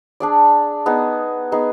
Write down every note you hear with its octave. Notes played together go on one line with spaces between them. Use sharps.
D4 G#4 D5
B3 D#4 G#4
B3 D#4 G#4